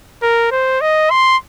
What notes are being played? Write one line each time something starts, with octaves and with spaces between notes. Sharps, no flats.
A#4
C5
D#5
C6